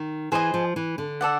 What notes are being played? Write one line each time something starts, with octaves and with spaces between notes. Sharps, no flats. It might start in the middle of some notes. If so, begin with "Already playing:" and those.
Already playing: D#3
E3 G#4 C5 D#5 G#5
F3
E3
D3
A4 D5 F#5